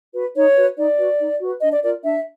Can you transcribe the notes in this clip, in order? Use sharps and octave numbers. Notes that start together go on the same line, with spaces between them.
F#4 B4
D#4 C#5
F#4 B4
D#4 D5
F#4 B4
D#4
F#4 B4
D4 D#5
D5
F4 A#4 D5
D4 E5